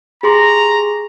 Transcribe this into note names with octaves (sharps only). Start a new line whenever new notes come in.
G4 G#4 A#5 C6